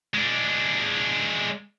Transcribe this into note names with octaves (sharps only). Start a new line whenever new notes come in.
G#3 D4